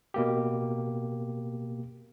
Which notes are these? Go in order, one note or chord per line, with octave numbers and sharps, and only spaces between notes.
B2 A#3 G4